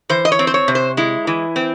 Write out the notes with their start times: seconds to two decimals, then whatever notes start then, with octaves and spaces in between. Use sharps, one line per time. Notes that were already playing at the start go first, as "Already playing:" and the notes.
0.09 E3 C5
0.25 D#5
0.32 C#5
0.39 C4
0.47 C5
0.54 C#5
0.68 C3
0.75 C5
0.97 G#3 E4
1.27 E3
1.56 C4